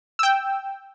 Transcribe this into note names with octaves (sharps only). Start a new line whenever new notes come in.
G5 E6